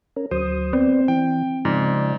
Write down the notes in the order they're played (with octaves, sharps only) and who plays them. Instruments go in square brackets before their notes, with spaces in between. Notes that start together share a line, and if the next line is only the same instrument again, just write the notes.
[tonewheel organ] C#4 A#4
[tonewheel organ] D2 F#3 D#6 [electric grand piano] C5
[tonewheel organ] B3 D5 [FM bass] C4
[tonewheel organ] E3 [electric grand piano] G5
[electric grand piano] G#2 [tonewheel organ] C#3 F3 D5